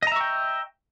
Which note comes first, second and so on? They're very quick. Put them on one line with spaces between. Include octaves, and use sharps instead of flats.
D#5 A#5 E5 C#6 G5